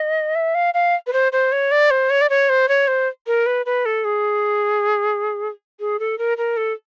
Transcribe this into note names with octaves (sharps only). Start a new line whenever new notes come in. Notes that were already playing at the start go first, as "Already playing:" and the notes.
Already playing: D#5
E5
F5
F5
B4
C5
C5
C#5
D5
C5
C#5
D5
C#5
C5
C#5
C5
A#4
B4
B4
A4
G#4
G#4
A4
A#4
A#4
A4